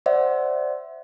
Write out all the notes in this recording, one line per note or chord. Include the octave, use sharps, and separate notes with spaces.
C5 D5 E5 F#5